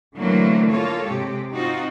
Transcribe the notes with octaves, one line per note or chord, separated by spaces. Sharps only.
D3 E3 F#3 A3 A#3 C4
A#3 F4 A4 C#5
C3 G#3 G4
C4 D#4 F4 F#4